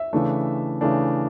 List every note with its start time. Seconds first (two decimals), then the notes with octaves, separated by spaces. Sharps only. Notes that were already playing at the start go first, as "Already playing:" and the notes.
Already playing: E5
0.13 C#3 E3 A3 D4
0.81 C#3 E3 A3 D4